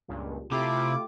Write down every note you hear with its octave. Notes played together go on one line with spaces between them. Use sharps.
C#2 G2 A#2
C3 A3 E4 F4 G4 D6